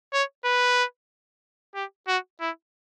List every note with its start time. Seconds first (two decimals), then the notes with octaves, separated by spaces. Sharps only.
0.13 C#5
0.45 B4
1.75 G4
2.08 F#4
2.40 E4